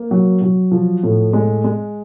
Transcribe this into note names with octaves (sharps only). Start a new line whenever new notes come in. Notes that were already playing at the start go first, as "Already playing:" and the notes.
Already playing: A#3
F#3
F#3
F3
A2
G#3
G#3